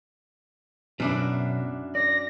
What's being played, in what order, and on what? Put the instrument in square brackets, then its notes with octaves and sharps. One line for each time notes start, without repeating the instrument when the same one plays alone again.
[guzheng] F#2 D4 E4 [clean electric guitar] B2 F#3
[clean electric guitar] D5 [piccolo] A#6